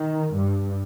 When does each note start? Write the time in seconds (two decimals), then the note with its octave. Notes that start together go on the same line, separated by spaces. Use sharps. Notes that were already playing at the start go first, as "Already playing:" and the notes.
Already playing: D#3
0.35 G2